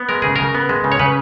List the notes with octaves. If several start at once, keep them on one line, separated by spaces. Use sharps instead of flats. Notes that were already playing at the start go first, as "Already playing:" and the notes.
Already playing: B3
G#3 A#4
C#3 G#4
C#3 A#4
B3
G#3
C#3
C#5
C#3 B4